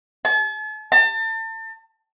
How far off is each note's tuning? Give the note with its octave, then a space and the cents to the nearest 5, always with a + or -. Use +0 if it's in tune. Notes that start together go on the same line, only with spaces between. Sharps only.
A5 -40
A5 +35